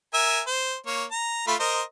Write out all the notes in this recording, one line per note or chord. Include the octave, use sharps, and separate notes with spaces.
A#4 E5 G#5
C5
A#3 C#5
A#5
A3 F4 B5
A#4 C5 D#5